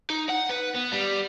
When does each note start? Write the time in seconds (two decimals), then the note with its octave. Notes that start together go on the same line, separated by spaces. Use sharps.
0.10 D#4
0.29 F#5
0.49 B4
0.75 B3
0.92 G3